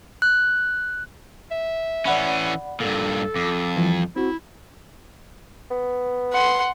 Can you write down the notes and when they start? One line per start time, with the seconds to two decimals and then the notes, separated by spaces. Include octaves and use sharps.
0.22 F#6
1.51 E5
2.05 E3 C#4 D5 F#5 B5
2.80 G2 A#2 A4
3.36 F2 D6
3.77 E3 F3 G3
4.16 C4 E4 F#4
5.71 B3
6.33 F#5 C6